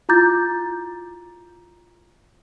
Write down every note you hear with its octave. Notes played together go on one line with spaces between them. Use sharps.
E4 F4 A#5 D6 G6 A6